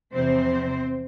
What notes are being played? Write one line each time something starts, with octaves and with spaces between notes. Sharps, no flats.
E2 C3 F3 C4 C5